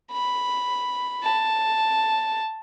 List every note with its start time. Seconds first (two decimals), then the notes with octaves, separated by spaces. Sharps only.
0.11 B5
1.23 A5